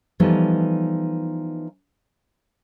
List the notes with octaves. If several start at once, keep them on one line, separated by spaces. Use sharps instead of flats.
E3 F3 G3 A3 B3 D#4